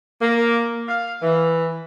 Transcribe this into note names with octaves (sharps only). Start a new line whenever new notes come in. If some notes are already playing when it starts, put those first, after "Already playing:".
A#3
F5
E3